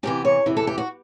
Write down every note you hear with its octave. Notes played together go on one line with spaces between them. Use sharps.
E2 C3 E3 G4
C#5
E2 C3 E3
A4
G4
F#4